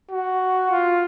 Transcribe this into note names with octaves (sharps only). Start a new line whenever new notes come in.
F#4
F4